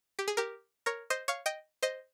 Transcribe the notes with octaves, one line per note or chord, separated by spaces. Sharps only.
G4
G#4
G4 A#4
A#4 C#5
C5 D#5
C#5 F5
D#5 G5
C5 D#5